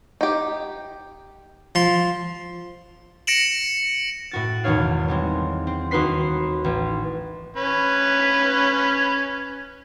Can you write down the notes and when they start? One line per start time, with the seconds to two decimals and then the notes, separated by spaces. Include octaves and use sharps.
0.21 D#4 G4
1.75 F3 C6
3.27 A#6 C#7 D7 E7 F#7
4.31 A2 F#4 A6
4.64 G#1 E2 B2 D#4 C#5 F5
5.08 G3 G#3 C4
5.67 C4
5.91 D#2 D#4 F#4 B4 C6 B6
6.64 A1
7.57 C#4 B4